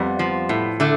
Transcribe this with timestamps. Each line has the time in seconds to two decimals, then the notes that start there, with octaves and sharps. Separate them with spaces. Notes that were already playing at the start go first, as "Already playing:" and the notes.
Already playing: F2 G3 B3
0.19 F3
0.49 A2
0.80 D3 A3